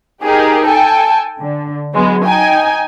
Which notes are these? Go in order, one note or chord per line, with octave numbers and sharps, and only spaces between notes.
D#4 G4 G#4 A#4
A4 G5 G#5
D3
F#3 G#3 B3
D#4 G5 G#5